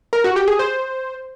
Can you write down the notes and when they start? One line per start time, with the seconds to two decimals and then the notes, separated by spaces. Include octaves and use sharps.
0.13 A#4
0.24 F#4
0.36 G4
0.48 G#4
0.59 C5